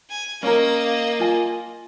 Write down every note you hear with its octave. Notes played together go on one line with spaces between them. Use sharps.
G#5
A#3 C#4 A#4 D#5
F4 G#5